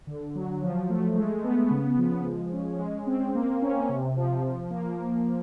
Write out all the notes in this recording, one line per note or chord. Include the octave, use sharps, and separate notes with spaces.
D3
F#3
F3
A3
G#3
B3
C#3
F3
G#3
C#4
G#3
C4
A#3
C#4
C3
F3
F3
A#3